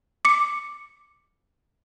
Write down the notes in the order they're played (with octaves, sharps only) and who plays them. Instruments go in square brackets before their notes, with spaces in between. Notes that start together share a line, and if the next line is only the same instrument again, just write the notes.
[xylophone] D6 C#7